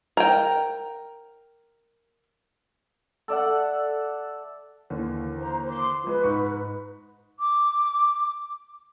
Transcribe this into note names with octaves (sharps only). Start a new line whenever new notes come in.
A#4 G5
A4 D5 E5 F#5
D#2 D3 E3
C5 A#5
C6 D6
F3 G#3 B4
G#2 D#4 C#6
D6